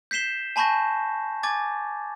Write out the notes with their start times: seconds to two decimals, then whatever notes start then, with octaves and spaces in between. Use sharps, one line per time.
0.11 G6 B6 C7 E7 G7
0.56 G#5 A5 B5 C#6 G6 A#6
1.43 G#5 D6 G#6 A6